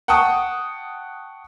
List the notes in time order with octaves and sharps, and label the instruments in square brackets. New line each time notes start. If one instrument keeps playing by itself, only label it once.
[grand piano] F#5 G5 A5 C#6 D#6